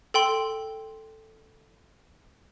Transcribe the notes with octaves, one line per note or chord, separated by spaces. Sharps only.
A4 G5 C6